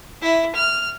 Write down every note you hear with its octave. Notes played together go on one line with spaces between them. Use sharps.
E4
F6